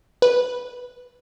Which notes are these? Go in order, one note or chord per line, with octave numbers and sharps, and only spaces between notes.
B4